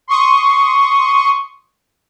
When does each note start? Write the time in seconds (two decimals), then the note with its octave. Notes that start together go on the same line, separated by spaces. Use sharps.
0.08 C6 C#6 D#6